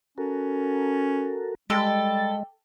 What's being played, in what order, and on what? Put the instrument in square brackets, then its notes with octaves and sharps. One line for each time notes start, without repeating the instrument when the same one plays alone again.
[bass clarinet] C#4 [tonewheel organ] F#4 A4 A#4
[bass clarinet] G3 [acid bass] G#3 [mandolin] G4 A4 [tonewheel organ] A6